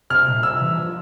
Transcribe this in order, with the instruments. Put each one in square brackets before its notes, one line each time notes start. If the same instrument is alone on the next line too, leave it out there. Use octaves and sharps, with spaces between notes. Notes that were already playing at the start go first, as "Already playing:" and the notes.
[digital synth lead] C3 [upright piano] F6
[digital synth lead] A#2
[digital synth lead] C3 [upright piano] E6
[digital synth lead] E3
F3